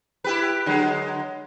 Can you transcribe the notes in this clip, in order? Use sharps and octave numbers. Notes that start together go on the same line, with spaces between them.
E4 G4 B4
D3 F#3 G#3